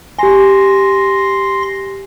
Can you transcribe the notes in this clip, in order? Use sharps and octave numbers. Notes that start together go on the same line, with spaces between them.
G4 G#5 C6 A#6